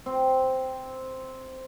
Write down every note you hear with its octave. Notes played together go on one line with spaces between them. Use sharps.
C4